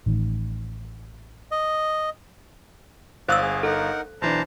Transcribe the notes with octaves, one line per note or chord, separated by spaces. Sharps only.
A1 D#3
D#5
G1 C5 D5 F5 D#6 E6 F#6
G#4
D#4 A4 A#4 F#5
B1 E3 D4 C5 A5 A#5